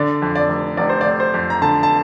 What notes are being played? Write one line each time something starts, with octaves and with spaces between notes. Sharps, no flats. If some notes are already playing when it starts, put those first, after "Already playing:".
Already playing: D3 D5
F2
D5
F1
F1 D5
C5
D5
F1
C5
F2
A#5
D3 A5
A5